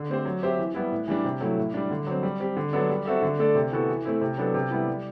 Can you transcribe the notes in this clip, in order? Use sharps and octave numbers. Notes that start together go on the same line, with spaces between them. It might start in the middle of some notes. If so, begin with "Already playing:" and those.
Already playing: D3
A3 C4 G4 C5
F#3
C4 G4 C5 E5
E3
G3 B3 E4
A2
E3 G3 D4
C3
F#3 A3 E4
A2
G3 D4
D3
F#3 C4
G3
C4 G4
D3
F#3 B3 D4 A4
G3
C4 F#4 A4 E5
D3
A3 D4 A4 D5
C3
E3 B3 F#4 A4
E3
A3 C4 E4
C3
F#3 B3 D4 A4
C3
G3 B3 E4
G3